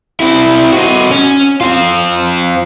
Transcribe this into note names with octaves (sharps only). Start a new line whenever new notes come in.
C4 E4
D#4 F#4
C#4
C4 F4